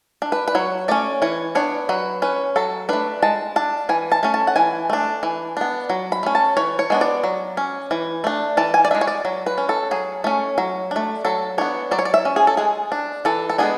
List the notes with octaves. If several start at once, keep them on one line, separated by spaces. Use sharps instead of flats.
D4
B4
B4
F#3 C#5
A3 C#4 D5
E3 C#5
B3 D4 C#5
F#3 B4
C#4 B4
F#3 A4
A3 D4 B4
G#3 A5
D4 A5
E3 G#5
A5
A3 C#4
A5
F#5
E3 G#5
A3 D4
E3
B3 D4
F#3
B5
A3 C#4
A5
E3 C#5
C#5
G#3 B3 D4
D5
F#3
C#4
E3
A3 D4
E3 A5
G#5
D5
G#3 D4 E5
C#5
D5
F#3
B4
C#4
A4
F#3 G#4
A3 C#4
F#3
A3 D4
F#3 A4
B3 D4 C#5
F#3 D5
C#5
D5
E5
C#4
G#4
A4
G#3 G#4
D4
E3 A4
A4
G#3 B3 D4 G#4